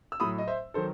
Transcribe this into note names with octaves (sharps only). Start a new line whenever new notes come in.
E6
A2 F#3 B5 D#6
D#5
C5 E5
D#3 F#3 A4 C5